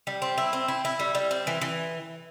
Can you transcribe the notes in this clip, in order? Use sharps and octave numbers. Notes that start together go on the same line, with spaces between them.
G3
C4
E4
C4
E4
E4
G3
G3
C4
E3
E3